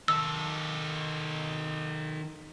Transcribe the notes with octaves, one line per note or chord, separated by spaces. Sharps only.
D#3 D#4 A4 E6